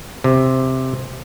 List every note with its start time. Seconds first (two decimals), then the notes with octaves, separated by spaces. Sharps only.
0.24 C3